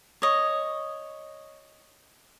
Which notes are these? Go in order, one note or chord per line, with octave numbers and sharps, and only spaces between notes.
C#5 D#5